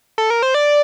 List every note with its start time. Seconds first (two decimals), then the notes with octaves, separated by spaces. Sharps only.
0.18 A4
0.30 A#4
0.43 C5
0.54 D5